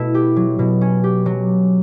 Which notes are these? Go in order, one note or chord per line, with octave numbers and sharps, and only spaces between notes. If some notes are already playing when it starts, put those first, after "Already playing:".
Already playing: B2 A3 E4
G4
F#3
B2
C#4
G4
F#3